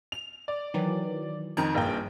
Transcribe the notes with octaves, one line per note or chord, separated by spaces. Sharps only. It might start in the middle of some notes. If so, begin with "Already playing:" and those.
F7
D5
D#3 E3 F#3
F2 D#3 A#5
A#1 G2 F3 A#3 G5